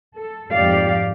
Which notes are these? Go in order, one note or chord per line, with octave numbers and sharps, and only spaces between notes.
A4
F2 G#2 G4 D5 F5